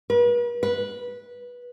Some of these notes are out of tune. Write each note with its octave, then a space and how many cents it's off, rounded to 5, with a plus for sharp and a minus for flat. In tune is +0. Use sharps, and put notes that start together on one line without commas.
B4 -40
B4 -15